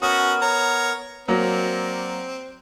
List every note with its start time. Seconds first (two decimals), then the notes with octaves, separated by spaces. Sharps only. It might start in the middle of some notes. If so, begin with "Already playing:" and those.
0.02 B3 C#4 F#4 A#4 D#6
0.42 C#5 A#5
1.28 F#3 A#3 C4 D5